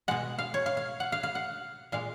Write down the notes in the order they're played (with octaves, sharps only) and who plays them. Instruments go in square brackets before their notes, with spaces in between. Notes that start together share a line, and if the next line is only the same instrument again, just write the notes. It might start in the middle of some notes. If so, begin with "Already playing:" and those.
[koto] B2 G#3 F#5
F5
C#5
F5
F5
F#5
F5
F5
F#5
A#2 G#3 F5